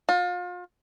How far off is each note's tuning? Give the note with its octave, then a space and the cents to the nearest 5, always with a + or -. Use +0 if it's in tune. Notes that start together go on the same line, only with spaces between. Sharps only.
F4 +35